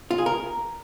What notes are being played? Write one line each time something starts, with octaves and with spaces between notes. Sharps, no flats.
F4
G#4
A#4